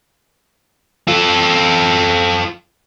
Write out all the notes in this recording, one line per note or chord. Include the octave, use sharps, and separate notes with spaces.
F4 A4